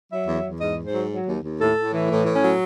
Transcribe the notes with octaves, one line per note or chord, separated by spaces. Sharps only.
F#3 E5
E2
E2
G#2 D#5
G#2
C5
F#3
F#3
D#2
D#2
A2 A4
A2
E3
A2
A2
C#4
F#3